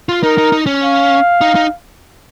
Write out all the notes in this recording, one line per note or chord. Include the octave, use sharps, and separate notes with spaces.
F4
D#4 A#4
D#4
D#4
C#4
F5
D#4
D#4